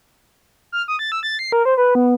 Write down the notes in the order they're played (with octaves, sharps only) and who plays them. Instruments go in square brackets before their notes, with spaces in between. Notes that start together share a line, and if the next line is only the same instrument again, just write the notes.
[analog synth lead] F6
D#6
A6
E6
A6
C7
A#4
C5
B4
B3